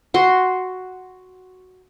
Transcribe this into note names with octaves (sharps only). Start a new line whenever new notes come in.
F#4 C6